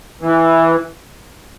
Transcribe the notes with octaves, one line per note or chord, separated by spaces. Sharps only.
E3